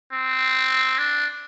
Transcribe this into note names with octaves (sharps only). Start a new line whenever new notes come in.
C4
D4